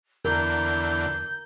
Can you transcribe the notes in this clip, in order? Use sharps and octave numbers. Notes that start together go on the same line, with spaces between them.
E2 D3 A#4 G6